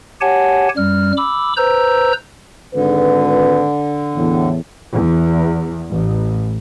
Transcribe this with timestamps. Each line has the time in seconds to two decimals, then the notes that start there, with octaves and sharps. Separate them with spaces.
0.21 G4 C#5 F#5 G#5 A5
0.77 F#2 G3 F6
1.17 B5 D6 E6
1.57 B4 C5 A#5 E6 G6
2.74 G#1 D3 B4
4.15 E2 A2
4.92 E2
5.92 A1